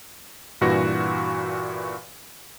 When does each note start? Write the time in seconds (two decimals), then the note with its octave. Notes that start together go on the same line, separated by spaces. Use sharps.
0.61 G2 A#2 E3 F#4 C#6 A#6